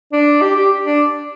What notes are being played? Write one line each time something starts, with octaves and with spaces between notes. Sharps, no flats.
D4
G4
G4
D4